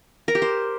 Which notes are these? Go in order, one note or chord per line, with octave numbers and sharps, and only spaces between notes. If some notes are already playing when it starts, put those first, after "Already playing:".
A#4
G4
C5